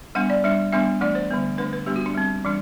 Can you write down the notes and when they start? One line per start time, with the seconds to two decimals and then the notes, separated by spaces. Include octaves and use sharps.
0.15 G3 B3 D4 F#5
0.30 D5
0.44 G3 D4 E5
0.73 G3 B3 D4 E5
1.01 E3 A3 D4 D5
1.15 C5
1.30 D3 G3 B3
1.58 D3 A3 D4 B4
1.73 B4
1.86 G3 B3 D4 G4
1.96 F#4
2.06 D4
2.15 G3 C4
2.45 E3 G3 D4